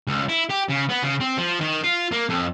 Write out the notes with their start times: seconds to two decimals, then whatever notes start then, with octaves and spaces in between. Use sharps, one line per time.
0.08 C#2
0.29 E4
0.50 G4
0.69 C#3
0.90 B3
1.04 C#3
1.21 C4
1.38 F3
1.61 D#3
1.83 F4
2.11 A#3
2.29 F2